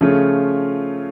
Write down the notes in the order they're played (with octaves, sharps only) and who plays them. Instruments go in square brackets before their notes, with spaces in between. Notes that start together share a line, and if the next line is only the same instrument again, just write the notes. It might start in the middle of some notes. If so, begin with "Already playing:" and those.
[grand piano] C#3 F3 A3 C#4 F4